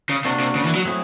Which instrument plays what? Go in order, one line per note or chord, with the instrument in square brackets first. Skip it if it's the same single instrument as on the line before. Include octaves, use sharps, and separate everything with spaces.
[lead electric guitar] C#3
[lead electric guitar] C3 [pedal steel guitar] A#3 D4 F#4
[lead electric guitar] C3
C#3
E3
F#3
[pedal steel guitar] F#3 A3 C4 E4 G#4